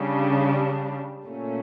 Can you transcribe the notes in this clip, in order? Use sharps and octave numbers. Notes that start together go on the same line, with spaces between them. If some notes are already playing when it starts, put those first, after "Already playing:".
Already playing: C#3 G3 D4
A#2 A3 C#4